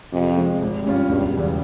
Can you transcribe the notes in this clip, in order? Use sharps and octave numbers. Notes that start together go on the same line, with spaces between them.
F2 C3
F3 G#3 C4
G#1
G2 G3 C#4 F4
E1 G2
E2 C#3 G3